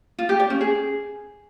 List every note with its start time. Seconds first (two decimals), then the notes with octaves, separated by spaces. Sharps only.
0.19 F4
0.29 G4
0.40 D5
0.50 C#4
0.61 G#4